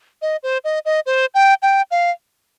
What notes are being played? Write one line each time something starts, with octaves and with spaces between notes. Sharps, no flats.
D#5
C5
D#5
D#5
C5
G5
G5
F5